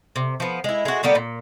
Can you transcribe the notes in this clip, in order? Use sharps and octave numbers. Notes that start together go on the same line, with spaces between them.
C3
F3 B3
G#3 E4
G#3 F#4
D3 G3 A#3 B3
A#2